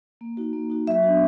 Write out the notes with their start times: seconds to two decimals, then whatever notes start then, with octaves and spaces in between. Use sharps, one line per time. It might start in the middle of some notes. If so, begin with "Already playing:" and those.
0.21 A#3
0.37 D#4 F#4
0.53 A#3
0.70 D#4 F#4
0.87 F#3 E5
1.03 B3 D4 F#4